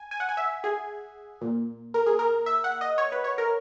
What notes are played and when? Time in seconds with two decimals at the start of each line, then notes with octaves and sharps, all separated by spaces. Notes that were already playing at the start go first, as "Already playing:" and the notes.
Already playing: G#5
0.11 G#5
0.20 F#5
0.29 G#5
0.37 E5
0.64 G#4
1.41 A#2
1.94 A#4
2.06 G#4
2.19 A#4
2.46 E5
2.64 F#5
2.81 D#5
2.98 C#5
3.12 B4
3.24 C#5
3.38 A#4